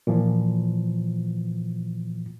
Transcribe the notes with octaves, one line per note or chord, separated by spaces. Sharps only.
A#2 E3 F3